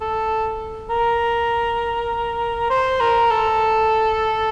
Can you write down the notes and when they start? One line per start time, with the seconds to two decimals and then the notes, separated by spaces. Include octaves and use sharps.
0.01 A4
0.90 A#4
2.70 C5
3.00 A#4
3.31 A4